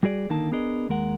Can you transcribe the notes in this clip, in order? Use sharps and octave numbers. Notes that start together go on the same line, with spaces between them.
G3 F#4 G#4 D5
D3 D#3 A#3 D#4 A5
B3 D4 G#4 A#4 D#5
D#2 G#3 A#4 F#5